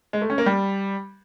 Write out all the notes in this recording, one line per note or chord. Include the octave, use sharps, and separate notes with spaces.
G#3
A3
C#4
A#3
G3